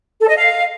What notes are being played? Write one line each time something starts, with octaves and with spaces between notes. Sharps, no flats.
A4
D#5
F5